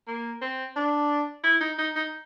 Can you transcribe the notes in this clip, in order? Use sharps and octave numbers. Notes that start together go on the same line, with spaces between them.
A#3
C4
D4
E4
D#4
D#4
D#4